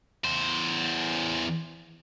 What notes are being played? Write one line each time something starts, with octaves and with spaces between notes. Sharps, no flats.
E2 C5